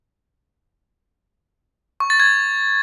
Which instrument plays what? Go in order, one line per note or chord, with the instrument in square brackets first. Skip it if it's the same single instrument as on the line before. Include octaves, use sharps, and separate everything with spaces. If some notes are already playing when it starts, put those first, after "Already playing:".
[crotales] C#6
A6
G#6